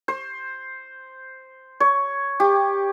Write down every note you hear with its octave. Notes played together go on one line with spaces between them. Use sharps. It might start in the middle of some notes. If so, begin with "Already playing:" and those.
C5
C#5
G4